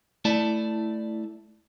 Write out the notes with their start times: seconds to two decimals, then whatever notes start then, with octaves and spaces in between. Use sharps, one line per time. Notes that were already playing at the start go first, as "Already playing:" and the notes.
0.25 A3 E4 D5 A5